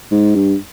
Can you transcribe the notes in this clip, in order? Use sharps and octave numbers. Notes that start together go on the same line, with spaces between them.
G#2
G2